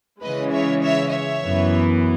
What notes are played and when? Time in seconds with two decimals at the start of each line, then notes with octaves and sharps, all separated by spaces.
0.22 C#3 E3 G#3 B4 D#5
0.52 C#5 E5
0.83 C#5 E5
1.13 C#5 E5
1.43 F#2 E3 B3